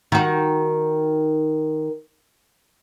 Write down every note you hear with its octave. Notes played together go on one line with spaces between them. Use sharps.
D#3 F#4